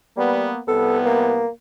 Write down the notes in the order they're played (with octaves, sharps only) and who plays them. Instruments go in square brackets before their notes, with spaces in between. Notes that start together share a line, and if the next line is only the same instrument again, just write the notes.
[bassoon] G3 [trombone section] A#3 B3
[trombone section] C2 B3 [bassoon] A4
[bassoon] A#3